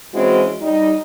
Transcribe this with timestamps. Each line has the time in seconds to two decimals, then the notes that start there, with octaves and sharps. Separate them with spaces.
0.14 E3 G#3 C4 C#4 E4 F#4
0.61 G3 D#4